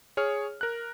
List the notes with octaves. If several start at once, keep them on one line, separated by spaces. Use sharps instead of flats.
G#4 C#5 F6
A#4 F#6